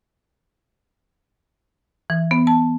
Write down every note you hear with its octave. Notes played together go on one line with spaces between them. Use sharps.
E3
B3
A5